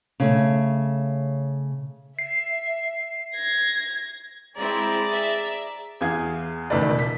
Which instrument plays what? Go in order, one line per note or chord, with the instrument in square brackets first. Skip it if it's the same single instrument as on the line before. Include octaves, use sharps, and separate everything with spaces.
[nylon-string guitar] C#3 A3
[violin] E5 [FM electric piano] C7
[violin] G#6 A#6
[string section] G#3 C4 E4 [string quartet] G#4 D5 A#5
[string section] E5
[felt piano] E2 G#4 F5 G#6
E1 C#2 D#3 A3 B4 D5
B6